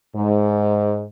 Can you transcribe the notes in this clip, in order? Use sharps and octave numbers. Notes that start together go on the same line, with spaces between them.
G#2